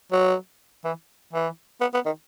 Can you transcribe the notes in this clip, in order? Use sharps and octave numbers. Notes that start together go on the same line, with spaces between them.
F#3
E3
E3
B3
B3
D#3